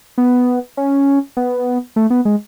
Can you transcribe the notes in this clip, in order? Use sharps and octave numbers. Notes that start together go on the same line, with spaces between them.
B3
C#4
B3
A3
B3
G#3